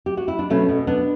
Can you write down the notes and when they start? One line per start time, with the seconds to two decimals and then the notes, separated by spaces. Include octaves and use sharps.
0.06 G4
0.17 F#4
0.28 E4
0.39 D4
0.50 B2 A3 C#4
0.69 B2
0.87 B2 B3 D4